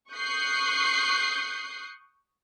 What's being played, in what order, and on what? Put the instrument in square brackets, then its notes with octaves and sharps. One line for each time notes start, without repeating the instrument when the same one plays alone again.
[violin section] C#6 D#6 F#6 G6 C7